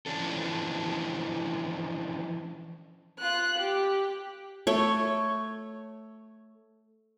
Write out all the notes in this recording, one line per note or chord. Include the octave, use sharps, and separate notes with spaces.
D3 E3 F3 C#4 D4 A4
F4 F#6
G4
A3 C#5